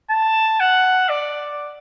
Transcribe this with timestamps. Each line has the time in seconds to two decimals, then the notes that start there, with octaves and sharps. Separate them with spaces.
0.10 A5
0.60 F#5
1.09 D5